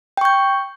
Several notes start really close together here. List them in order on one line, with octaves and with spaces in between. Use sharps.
G5 C#6 G6